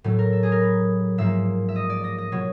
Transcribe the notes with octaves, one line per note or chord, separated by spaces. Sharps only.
A2 F#3 A3
A#4
A4
G#4
A#4
B4
G#2 F3 A#3 E5
E5
D#5
D5
D#5
D#5
B2 F#3 C#5